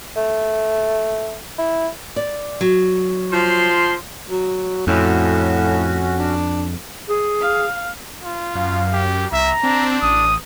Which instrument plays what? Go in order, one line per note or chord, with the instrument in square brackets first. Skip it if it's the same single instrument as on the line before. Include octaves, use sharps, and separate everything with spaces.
[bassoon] A3
E4
[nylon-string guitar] D5
F#3
[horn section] F3 C6
[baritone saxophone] F#3
[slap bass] F2 [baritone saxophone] A2 [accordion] C#4 F#4
[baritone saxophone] D4
[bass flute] G#4
[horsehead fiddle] F5
[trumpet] F4
[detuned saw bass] F#2 [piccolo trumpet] F5
[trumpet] G4
[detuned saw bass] C2 [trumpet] E5 [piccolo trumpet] A#5
[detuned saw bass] C4 [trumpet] D4
[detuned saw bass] A1 [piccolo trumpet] D#6